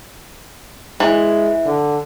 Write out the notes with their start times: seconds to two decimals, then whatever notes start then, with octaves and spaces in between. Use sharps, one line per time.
1.00 E3 G#3
1.65 D3